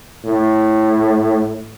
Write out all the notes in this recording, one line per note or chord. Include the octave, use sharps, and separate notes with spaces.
A2